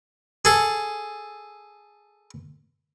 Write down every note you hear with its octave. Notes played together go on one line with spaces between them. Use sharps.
G#4 A4